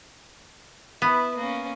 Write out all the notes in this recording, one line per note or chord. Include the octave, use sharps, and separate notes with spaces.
B3 E4 B4
A#3 C#4